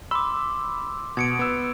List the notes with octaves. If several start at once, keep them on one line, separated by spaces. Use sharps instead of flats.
B5 C6 D6 E6
B2 G#6 C#7 D7
B3 E6